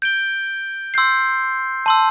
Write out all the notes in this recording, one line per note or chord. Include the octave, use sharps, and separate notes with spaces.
G6 D7 G7
C6 E6 G6 C7
A5 C6 E6